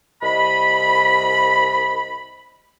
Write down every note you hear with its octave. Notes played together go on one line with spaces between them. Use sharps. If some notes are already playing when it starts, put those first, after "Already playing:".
C2 D#5 B5